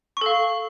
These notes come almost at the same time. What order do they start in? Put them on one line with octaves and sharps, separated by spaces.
C#6 A4 F5